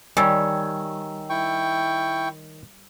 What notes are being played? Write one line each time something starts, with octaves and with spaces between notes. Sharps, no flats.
D#3 G3 C#5 G#5 E6
E4 G5 C#6